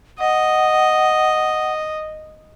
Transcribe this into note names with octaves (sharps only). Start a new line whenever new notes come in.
D#5 F#5